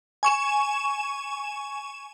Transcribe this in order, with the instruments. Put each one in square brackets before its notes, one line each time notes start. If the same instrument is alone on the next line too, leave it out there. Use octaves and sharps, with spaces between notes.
[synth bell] G#5 C#6 E7